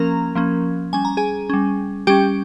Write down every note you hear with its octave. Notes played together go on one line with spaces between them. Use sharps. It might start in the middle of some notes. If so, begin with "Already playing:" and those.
Already playing: F3 A#3 C#4 A#4 A#5
F3 A#3 C#4
G3 C#4 G#5
A#5
G#4 G#5
G3 C#4
G3 C#4 G4 G5